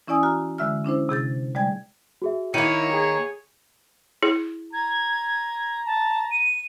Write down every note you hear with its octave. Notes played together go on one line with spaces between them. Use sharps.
E3 C#4 E4 D5 G#5 D#6
F#4 A#5 F6
D3 G#3 E5 E6 F6
C#4 D4 E4 C5
C3 G#4 G6 A6
G3 G#3 D5 G5 G#6
F#4 G#4 E5
D#3 A#3 E4 C#5 C#7 D#7
G#4
E4 G#4
A#5 G#6
A5
D#7